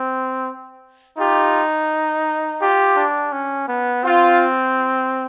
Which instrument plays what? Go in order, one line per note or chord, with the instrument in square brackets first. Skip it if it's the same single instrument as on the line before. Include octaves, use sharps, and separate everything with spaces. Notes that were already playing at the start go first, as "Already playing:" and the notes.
Already playing: [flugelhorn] C4
[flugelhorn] D#4 [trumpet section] F4 G4
[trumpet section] F4 G4
[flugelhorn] D4
C#4
B3
[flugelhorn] C4 [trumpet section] F4